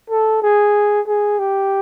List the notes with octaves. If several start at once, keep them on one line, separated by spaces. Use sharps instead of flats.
A4
G#4
G#4
G4